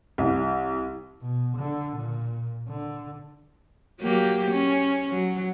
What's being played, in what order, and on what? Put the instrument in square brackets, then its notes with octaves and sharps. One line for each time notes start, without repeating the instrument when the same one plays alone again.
[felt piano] C2
[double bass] B2
D3
A#2
D3
[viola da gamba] F#3 A#3 G4
C#4
F#3